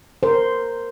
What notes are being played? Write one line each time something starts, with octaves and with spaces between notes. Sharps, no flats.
A#4 C5